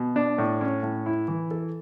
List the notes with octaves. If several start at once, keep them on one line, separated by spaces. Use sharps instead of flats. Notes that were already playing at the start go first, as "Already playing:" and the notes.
Already playing: B2
D4
A2
C#4
A2
E4
E3
A4